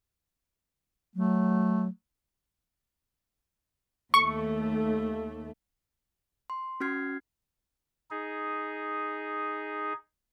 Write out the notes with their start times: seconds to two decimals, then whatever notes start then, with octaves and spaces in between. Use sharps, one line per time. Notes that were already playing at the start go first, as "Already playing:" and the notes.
1.15 F#3 A3
4.14 D#2 A3 C#6
6.50 C6
6.80 C#4 F#4 F6 G#6 C7
8.11 D#4 G#4